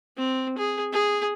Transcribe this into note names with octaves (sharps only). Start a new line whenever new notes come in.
C4
G#4
G#4